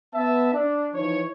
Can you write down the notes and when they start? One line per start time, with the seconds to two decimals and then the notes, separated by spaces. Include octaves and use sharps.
0.14 B3 E5 A5
0.53 D4
0.94 E3 F3 D#4 C#5